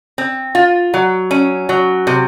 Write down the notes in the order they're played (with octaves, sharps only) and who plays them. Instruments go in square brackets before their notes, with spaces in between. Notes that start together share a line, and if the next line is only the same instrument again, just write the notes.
[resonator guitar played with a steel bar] C4
F4
F#3
C#4
F#3
C3